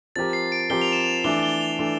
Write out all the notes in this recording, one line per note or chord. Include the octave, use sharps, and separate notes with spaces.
F3 C4 G4 A#4 A6
C7
D7
F3 C4 G4 A#4 G7
F7
E7
F7
E3 A3 D4 G7
G7
F7
E3 A3 D4